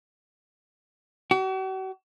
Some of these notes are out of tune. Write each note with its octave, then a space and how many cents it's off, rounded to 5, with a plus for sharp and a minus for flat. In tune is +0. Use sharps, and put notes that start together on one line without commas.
F#4 +45